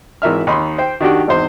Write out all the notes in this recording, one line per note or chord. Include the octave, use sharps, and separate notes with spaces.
G#1 E3 A#4 E5 F6
D#2 D#4 B5 C6
C5 G5
D#3 D4 F#4 G4
G#1 E2 D#4 C5